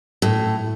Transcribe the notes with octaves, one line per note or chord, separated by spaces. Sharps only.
A2